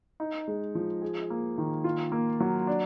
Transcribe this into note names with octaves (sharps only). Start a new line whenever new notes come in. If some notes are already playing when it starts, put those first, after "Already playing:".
D#4
G#3
F3
G#4
A#3
D#3
F4
A#3
F#3
D4